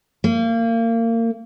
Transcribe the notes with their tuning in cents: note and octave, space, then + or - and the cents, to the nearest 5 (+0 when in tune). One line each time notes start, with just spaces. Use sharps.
A#3 -30